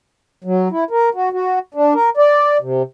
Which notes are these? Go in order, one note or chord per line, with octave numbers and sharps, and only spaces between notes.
F#3
E4
A#4
F#4
F#4
D4
A#4
D5
C3